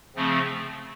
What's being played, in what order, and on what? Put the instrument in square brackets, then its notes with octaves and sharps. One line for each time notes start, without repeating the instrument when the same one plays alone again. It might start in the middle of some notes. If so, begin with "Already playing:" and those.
[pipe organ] C#3 F3 A3 C4